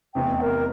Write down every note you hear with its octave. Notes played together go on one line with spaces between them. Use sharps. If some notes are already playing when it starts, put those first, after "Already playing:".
F1 E2 C3 G5
A#4